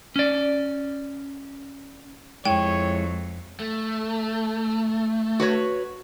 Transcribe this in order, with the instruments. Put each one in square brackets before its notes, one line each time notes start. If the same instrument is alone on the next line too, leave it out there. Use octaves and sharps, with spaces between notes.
[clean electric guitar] C#4 D5
[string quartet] F2 [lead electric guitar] G#3 E4 [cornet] C#5 [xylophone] G5
[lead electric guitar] A3
[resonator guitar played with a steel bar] F#4 B4 C#5